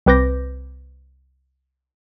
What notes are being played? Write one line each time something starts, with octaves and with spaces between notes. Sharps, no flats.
C2 C4 B4 D6 G6 A#6